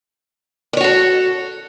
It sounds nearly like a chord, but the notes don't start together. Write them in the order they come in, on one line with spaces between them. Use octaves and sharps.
D5 C#5 F#4 A4